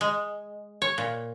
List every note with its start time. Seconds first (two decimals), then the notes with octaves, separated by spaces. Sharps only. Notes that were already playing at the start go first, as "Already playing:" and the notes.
0.01 G#3
0.82 C#5
0.98 A#2